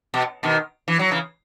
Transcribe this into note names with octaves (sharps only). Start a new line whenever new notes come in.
B2
B2 D#3
E3
F#3
C#3 E3